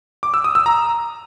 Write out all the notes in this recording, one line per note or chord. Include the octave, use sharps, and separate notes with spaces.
D6
E6
D#6
E6
A#5